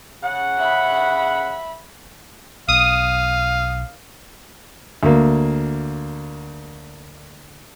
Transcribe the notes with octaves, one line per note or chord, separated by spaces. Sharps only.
C#3 F#5
E5 B5
B1 F5 D#6
D2 A#3